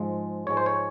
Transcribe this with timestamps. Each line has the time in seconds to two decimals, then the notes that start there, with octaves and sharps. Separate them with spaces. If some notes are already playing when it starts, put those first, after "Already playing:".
Already playing: G#2 F3 G#3
0.47 G#2 F3 G#3 C#5
0.57 C5
0.66 C#5